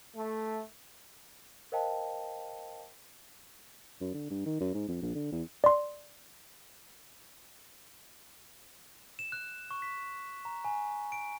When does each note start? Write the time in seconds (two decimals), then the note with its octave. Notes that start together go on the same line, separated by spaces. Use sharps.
0.15 A3
1.72 A#4 C5 D#5 F5 G5 A5
4.01 F#2
4.14 D3
4.30 G2
4.46 D#3
4.60 F#2
4.74 G#2
4.89 F2
5.02 A#1
5.15 D3
5.32 E2
5.64 D5 C6
9.19 E7
9.32 F#6
9.71 C#6
9.82 B6
10.45 A#5
10.65 G#5
11.12 D7